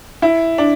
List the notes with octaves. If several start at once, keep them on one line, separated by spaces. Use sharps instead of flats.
E4
D4